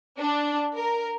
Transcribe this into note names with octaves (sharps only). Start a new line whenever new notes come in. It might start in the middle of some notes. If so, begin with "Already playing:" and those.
D4
A#4